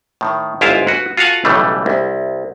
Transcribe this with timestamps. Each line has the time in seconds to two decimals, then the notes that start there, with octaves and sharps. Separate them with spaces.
0.21 A2 D#3
0.61 G1 G#2 E4 F4 C5 F5
0.87 F#4 B4
1.17 F4 F#4 A4 F5 F#5 G#5
1.45 B1 A2 C#3 E3 G3 A3
1.86 C2